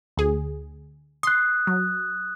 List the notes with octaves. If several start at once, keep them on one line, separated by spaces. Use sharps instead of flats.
D2 G#4
C6 D#6 F#6
F#3